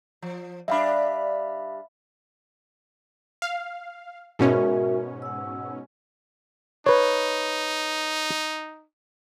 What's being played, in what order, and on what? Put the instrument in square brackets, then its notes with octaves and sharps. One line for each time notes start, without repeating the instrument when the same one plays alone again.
[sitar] F3
[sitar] G3 D4 [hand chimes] E5 F5 B5
[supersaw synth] F5
[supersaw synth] G#2 B2 C#4 [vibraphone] F#4 A#4 E5
[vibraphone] F#5 E6
[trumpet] D#4 [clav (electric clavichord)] B4 C#5